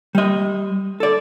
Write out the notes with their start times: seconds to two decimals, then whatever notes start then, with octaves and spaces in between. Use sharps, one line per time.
0.15 G3 D#5
1.00 A4 D5